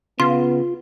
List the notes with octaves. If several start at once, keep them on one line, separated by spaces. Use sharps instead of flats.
C#3 B3 F4 C6